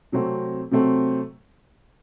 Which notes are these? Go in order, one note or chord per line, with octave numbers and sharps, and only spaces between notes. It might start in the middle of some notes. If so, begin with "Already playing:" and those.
C3 F#3 A3 C4
C3 F#3 A3 C4